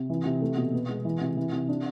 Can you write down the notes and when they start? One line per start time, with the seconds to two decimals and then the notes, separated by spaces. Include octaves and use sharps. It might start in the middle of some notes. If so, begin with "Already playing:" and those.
Already playing: C3
0.10 E3
0.25 C3
0.42 A3
0.57 B2
0.74 B3
0.89 G#3
1.05 E3
1.21 C3
1.37 E3
1.53 C3
1.69 D4